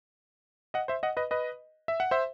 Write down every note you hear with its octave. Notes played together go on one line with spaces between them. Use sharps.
D#5 F#5
C5 E5
D#5 F#5
B4 D#5
B4 D#5
E5
F#5
C5 E5